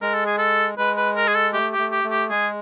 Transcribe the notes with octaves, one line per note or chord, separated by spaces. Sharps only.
G#3 A#4
A4
G#4
A4
G#3 B4
B4
A#4
G#4
A4
A3 G4
G4
A3
G4
A3
G4
G#3 G#4